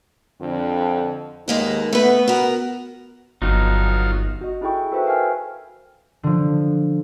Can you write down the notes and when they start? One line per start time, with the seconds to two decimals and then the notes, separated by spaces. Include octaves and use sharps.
0.41 F2 D3
1.48 D#2 G#3 A#3 B3 D#4
1.93 A3 B3 B4
2.28 F#4 A#4
3.42 G1 F#3 B3 D#4 F4
4.41 F#4 D#5
4.61 D#4 E4 G#4 A4 G5 C#6
4.92 F#4 A4 B4 C5 E5 G5
5.06 A#4 B4 F5 G5 G#5 F6
6.23 D3 F3